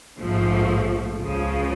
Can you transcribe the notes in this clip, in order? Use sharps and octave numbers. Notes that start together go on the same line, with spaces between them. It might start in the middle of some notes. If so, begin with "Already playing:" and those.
A#1 G#2 F3 A3
C#2 C#3 F3